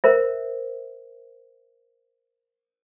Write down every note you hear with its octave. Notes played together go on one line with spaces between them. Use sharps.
A#4 C5 E5